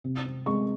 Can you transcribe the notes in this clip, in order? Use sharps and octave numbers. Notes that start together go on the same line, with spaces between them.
C3
C4
G#3 C#6